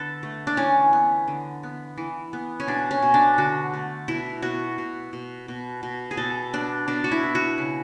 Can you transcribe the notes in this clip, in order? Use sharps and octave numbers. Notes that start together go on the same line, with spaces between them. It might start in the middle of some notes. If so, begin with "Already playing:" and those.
Already playing: D3 B3 A4 B4
A3
D4
E3 C#4
B3
D3
B3
E3
B3
C#4
B2 D4
C#4
B2
D4
D3 F#4
A3
B2 E4
B2 F#4
B2
B2
B2
B2
G#4
B2 A4
B3 D4
B2 D4
F#4
E4
B3
F#4
C#3